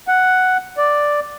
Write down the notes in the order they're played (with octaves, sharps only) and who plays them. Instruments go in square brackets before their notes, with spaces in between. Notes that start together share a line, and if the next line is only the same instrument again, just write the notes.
[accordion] F#5
D5